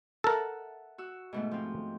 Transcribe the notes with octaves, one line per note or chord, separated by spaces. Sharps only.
A4 A#4 E5 F#5 A5
F#4 E6
G#2 B2 A3
F3 C4